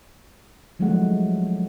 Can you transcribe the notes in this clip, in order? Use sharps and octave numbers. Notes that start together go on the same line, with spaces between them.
F3 F#3 G#3 A3 D#4 F#5